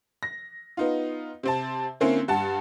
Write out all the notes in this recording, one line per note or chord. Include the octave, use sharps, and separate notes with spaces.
A#6
B3 D#4 F4
C3 C4 A5
D3 A#3 C4 C#4 E4
G2 F#5 A5